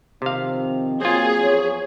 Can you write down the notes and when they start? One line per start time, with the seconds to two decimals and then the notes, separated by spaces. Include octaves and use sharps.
0.22 C3 D#3 F3 C4 F5
1.01 F#3 A#3 C4 F4 G#4
1.39 E2 F3 C#5